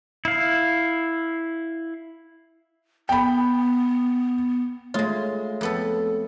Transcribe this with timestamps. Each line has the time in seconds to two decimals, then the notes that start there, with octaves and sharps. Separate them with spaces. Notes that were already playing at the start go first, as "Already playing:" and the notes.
0.25 E4 F5
3.09 B3 G5 B5
4.94 G#3 A3 F4 C#5
5.61 F2 B3 A4